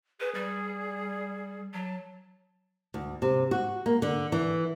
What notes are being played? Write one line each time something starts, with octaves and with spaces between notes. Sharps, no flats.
G#4 B4
G3
F#3 A5
D2
C3
F#4
A#3
D3
E3